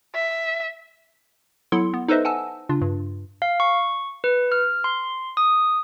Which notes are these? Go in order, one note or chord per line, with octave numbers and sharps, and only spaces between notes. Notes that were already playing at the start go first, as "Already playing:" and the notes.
E5
F#3 B3 E4 A4 C6 C#7
B3
D#4 A4 B4 C5 D#5 E5
F#5 G#5 A5 E6
C#3 D4 F4
G2
F5
C#6
B4
F6
C6
D#6